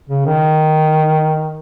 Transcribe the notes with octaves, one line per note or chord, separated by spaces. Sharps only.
C#3
D#3